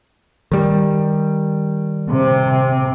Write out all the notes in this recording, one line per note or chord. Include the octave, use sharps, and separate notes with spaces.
D#3 G3
C3